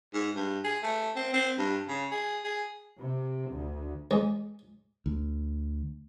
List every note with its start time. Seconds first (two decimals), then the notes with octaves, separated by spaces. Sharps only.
0.14 G#2
0.35 G2
0.64 G#4
0.83 A3
1.16 C4
1.33 C4
1.58 G2
1.88 C#3
2.12 G#4
2.44 G#4
2.99 C3
3.53 D2
4.11 E2 G#3
5.06 D2